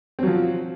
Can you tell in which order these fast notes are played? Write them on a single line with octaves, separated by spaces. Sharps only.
C4 F#3 F3